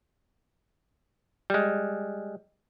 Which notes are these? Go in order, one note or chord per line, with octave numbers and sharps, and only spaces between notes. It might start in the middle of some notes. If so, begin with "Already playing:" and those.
G3 G#3